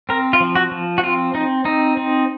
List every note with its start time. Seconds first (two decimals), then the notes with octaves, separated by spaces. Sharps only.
0.09 C4 A#4
0.33 F4
0.40 F3
0.55 F#4
0.71 F3
0.98 F#4
1.03 C4 F4
1.34 C4 D#4
1.65 C4 D#4
1.97 C4